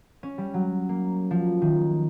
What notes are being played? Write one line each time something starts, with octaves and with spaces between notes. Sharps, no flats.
C#4
G3
F#3
A#3
F3
D#3